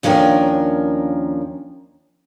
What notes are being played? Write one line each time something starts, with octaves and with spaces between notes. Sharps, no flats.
D#2 F3 C#4 D4 A#4 G5